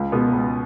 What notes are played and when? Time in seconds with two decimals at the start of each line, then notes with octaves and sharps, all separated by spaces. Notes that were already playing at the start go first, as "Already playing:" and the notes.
Already playing: C#2
0.12 B2 G#3 B3
0.33 C#2